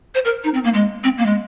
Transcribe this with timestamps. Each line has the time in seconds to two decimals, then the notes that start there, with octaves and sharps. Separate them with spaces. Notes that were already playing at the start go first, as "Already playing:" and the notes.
0.15 C5
0.25 A#4
0.44 D#4
0.54 C4
0.64 A#3
0.74 G#3
1.04 C4
1.18 A#3
1.26 G#3